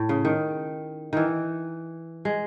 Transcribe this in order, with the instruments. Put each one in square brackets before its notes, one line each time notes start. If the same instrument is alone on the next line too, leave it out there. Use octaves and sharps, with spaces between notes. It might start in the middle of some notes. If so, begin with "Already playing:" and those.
Already playing: [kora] A2
C#3
D#3
D#3 E3
G#3